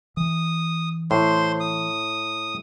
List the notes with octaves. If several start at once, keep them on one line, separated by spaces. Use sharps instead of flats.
E3 D#6
A2 C5 C6
D#6